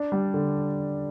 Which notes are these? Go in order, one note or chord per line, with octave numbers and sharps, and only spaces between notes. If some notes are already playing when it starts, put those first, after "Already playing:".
Already playing: D4
G3
D3